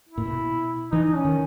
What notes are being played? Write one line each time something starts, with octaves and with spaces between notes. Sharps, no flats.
E4
A#2
B2
E3 D#4
D#4
C#4
D#3